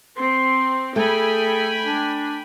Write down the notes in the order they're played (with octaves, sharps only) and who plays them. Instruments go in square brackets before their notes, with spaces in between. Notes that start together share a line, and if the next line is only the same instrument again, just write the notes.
[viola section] C4 [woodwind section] C6
[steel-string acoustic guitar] A3 [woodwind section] G#4 A4 [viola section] G5 G#5 B5
[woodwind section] D4